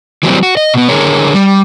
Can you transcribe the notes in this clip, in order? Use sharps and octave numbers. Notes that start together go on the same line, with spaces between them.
E3 F#3 G3 C4
F#4
D#5
B2 B3
D3 G#4 A#4 C#5
G3